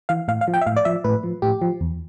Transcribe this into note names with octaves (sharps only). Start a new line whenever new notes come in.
E3 F5
A2 F5
F5
F3
G5
E5
A2 F5
D5
F3 E5
A2 B4
F3
A2 G4
F3
E2